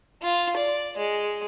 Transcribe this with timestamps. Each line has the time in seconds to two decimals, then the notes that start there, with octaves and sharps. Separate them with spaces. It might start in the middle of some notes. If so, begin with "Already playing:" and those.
0.22 F4
0.57 D5
0.97 G#3